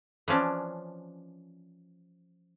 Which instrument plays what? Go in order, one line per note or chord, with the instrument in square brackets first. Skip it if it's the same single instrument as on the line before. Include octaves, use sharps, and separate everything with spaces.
[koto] E3 F3 C#4 D4